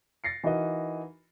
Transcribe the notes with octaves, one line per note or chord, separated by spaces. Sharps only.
A6 A#6 C7 C#7
E3 D#4 F#4 A#4 D#5